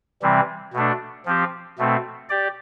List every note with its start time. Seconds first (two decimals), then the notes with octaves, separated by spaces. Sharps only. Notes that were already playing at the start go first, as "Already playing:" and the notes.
0.22 C3 E3 G3 C4
0.73 B2 A3 D4
1.26 F3 C4 G4
1.78 B2 A3 C4
2.29 G4 D5